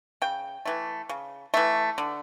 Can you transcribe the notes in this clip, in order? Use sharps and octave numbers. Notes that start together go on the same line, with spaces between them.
C#3 G5
E3 A3
C#3
E3 A3
D3